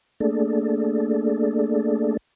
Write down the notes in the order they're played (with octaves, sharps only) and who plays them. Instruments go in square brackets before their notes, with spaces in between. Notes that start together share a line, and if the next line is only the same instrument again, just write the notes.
[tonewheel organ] A3 A#3 D4 G#4 A4 D5